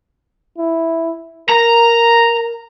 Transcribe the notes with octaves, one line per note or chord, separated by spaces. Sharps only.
E4
A#4 A#5